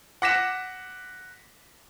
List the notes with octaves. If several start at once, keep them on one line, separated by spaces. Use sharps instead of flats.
F#5 D6 A#6 B6 C#7 E7